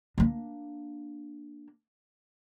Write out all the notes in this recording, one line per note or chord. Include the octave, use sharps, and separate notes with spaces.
A#3 D4